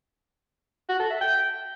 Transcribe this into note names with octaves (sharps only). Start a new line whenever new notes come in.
F#4
A4
E5
G5